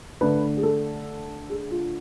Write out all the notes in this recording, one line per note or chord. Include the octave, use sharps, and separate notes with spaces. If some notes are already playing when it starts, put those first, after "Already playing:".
D3 A3 D4 B4
G#4
A4
G#4
F4